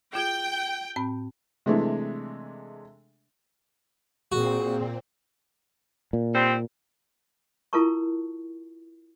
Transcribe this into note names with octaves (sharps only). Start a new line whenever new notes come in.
F4 G#4 G5 G#6
A2 C4 B5
C3 E3 G#3 A3 D4
A#2 C4 F#4 G#4
A#2
D#3 G3 C4
E4 F4 A4 A#4 A5 C#6